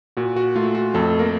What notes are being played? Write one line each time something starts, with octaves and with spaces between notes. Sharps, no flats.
A#2 F#4
F#4
A3 F4
F#4
F2 A3 A4
A#3 A#4